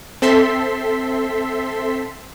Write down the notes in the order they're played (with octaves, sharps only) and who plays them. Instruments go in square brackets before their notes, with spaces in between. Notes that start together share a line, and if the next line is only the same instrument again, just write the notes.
[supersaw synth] C4 A4 E5 C6 B6